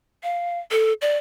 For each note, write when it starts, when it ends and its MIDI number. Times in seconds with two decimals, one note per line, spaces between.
0.23 0.59 77
0.71 0.93 69
1.02 1.17 74